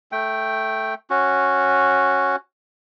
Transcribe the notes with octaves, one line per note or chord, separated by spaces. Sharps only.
A3 G5
C#4 F#4